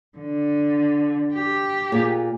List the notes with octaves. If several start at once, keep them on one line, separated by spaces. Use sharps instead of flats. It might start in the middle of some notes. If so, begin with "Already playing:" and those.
D3
G4
A#2 G#4